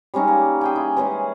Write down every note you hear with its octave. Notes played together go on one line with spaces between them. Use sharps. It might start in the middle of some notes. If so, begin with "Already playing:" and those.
G3 G#3 C#4 D#4
A#3
G#4 G5 G#5
E4
E3 G#3 C#4